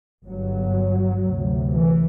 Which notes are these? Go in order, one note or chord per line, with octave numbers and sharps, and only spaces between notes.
G1 G2 F#3
D2 C3
E3